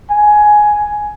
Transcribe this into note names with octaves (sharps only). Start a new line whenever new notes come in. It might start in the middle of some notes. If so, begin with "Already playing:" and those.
G#5